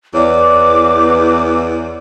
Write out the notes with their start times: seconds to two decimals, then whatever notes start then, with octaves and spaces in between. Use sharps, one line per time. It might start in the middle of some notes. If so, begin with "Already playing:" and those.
0.14 E2 B4 C#5 D5 D6